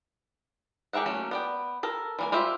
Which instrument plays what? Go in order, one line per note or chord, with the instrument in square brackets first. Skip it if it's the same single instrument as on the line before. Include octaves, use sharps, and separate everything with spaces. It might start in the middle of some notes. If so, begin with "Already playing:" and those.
[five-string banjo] G4 G#4 A#4 E5 F#5
F#3 A3 A#3 C#4
B3 D5 G5
A4 A#4
E3 A#3 G#5
E4 F4 G4 C5 E5